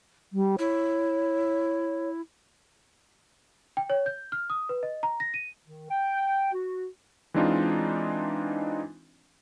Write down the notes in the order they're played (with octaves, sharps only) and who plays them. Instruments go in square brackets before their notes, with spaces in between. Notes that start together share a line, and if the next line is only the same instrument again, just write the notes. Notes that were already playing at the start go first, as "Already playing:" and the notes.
[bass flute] G3
[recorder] E4 [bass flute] C#5
[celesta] G5
C#5
G6
F6
D#6
B4
D#5
A#5
A#6
D#7
[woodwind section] D#3
G5
F#4
[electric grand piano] E3 G#3 C4 D4 D#4 F4